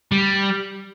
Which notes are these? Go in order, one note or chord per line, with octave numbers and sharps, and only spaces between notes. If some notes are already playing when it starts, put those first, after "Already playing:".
G3